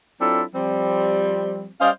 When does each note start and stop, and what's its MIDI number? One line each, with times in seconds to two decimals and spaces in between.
0.21 0.43 54
0.21 0.43 60
0.21 0.43 62
0.21 0.43 64
0.21 0.43 65
0.21 0.43 69
0.55 1.69 53
0.55 1.69 55
0.55 1.69 60
1.81 1.91 55
1.81 1.91 61
1.81 1.91 72
1.81 1.91 75
1.81 1.91 77